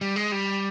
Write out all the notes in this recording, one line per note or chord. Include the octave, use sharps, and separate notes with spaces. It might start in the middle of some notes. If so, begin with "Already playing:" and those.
G3
G#3
G3